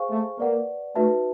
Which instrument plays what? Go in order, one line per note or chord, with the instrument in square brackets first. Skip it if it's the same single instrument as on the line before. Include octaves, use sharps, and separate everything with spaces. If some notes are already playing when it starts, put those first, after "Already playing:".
Already playing: [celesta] G#4 C5 F5 G#5 C#6
[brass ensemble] A3
[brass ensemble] A#3 [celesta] B4 D5 F#5
[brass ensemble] A3 [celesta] D#4 F#4 B4 E5 A5